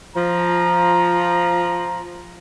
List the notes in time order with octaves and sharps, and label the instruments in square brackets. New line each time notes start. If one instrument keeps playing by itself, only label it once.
[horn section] F3 A#5